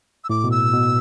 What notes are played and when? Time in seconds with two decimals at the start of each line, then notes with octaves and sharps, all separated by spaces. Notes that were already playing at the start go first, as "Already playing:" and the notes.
0.24 E6
0.30 A2 D6
0.44 B2
0.51 E6
0.73 B2